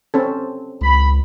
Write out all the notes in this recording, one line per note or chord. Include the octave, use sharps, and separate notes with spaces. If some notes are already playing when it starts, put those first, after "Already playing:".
C4 C#4 A4
C#2 B5